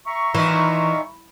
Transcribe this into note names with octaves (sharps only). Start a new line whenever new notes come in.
E5 A#5 C#6
A#2 D#3 E3 D#4